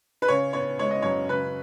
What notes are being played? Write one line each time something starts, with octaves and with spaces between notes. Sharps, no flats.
B4
C#3 C#5
B3 C#5
G#3 C#5
D#5
F#2 C#5
C#3 B4